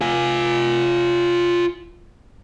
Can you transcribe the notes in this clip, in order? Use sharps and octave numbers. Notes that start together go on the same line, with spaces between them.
F4 G#5